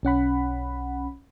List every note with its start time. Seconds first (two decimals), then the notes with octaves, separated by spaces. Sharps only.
0.03 B1 C#4 F#5 B5